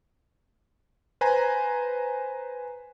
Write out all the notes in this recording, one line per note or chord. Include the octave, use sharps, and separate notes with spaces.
B4 C5 G#5 A#5